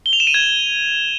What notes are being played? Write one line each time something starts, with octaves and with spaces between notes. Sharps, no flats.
G7
F7
E7
D#7
G#6